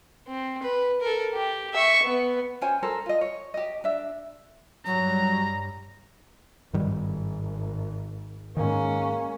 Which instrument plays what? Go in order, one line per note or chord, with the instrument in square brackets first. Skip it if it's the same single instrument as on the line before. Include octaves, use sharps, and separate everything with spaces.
[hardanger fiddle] C4
B4
A4 A#4
G4
E5 C#6
B3
[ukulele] C#4 C5 G5 G#5
A4 A#4 C5
F4 D#5
C#5
G4 D#5
D4 E5
[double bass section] G2 G3 [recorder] F#3 [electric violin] A#5
[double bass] G#1 [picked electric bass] G2 D#3 G3
[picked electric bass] G#2 D#3 [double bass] G#3 C#4 [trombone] A#3